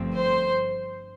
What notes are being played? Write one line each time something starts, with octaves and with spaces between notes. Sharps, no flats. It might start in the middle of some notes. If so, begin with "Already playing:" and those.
Already playing: G1 G2 F3 A3 C4
C5